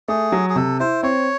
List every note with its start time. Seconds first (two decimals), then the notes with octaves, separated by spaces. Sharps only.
0.08 A3 G#4
0.32 F#3
0.50 G#4
0.56 C3 A4
0.80 E4 C5
1.03 C4 C#5